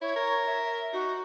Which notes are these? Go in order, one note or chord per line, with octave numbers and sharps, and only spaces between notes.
E4 C#5
A#4
E5
D#4 F#4